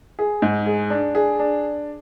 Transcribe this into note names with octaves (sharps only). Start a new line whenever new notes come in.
G#4
G#2
G#4
D4
G#4
D4